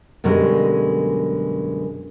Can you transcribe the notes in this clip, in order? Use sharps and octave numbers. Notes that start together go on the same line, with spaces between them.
F#2 B2 D3 G3 G#3